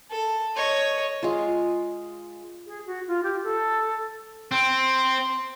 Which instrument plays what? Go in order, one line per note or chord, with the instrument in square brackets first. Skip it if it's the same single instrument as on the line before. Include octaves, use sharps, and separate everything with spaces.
[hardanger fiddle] A4
C#5 D#5
[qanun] G#3 F4
[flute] G#4
F#4
F4
G4
A4
[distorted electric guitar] C4